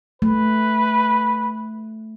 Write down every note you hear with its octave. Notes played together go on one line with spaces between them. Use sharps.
A3 B4